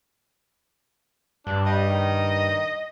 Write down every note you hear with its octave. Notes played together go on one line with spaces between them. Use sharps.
G2 D4
G3 D#5
D#3